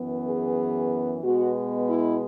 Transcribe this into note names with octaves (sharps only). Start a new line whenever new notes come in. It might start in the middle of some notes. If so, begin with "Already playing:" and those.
Already playing: F#2 E3 B3
G#4
B2 G#3 B3 F#4
E4